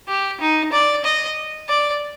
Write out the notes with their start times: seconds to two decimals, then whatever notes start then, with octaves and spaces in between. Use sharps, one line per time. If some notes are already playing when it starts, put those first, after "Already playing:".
0.08 G4
0.40 D#4
0.72 D5
1.04 D#5
1.69 D5